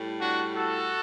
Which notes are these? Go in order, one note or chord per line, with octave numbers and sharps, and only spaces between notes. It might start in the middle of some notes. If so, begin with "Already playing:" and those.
Already playing: A2 G3
D4 F#4
F#4 A4